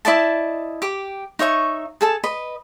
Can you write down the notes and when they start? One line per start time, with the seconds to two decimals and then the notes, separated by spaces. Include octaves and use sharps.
0.05 E4 D5 D#5 A5
0.82 G4 D6
1.39 D#4 C#5 E5 C#6
2.01 G#4 A4 A5
2.24 B4 D#5